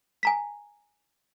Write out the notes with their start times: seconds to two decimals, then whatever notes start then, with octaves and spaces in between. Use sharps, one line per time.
0.23 G#5 A#5 B6